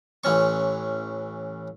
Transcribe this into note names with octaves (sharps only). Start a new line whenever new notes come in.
A1 E3 C#4 C#6